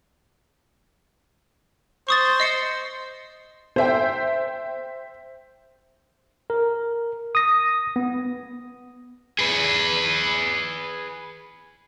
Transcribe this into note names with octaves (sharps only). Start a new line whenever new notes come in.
C5 C#6 D#6 A6
D#5 C7 C#7
C5 E5 G5
A#4
D#6 A#6
B3
G#4 B4